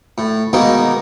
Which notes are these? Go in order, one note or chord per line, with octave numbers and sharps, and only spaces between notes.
A2
B2 D#3 G#3 A#3 D#4